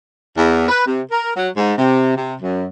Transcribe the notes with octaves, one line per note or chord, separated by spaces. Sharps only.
E2
B4
C3
A#4
F#3
G#2
C3
C3
F#2